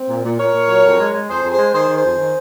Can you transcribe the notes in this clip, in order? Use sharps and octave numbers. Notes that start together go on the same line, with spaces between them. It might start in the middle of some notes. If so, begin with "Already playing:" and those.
Already playing: C4
A#2
A#2
A#2 A#4 C#5
A#2
F#3
F2
G#3
G#3
F2 G#4 C5
F2
G#4 C5
G#3
D#3 G#4 C5
D#3
G#4 C5
F2
D#3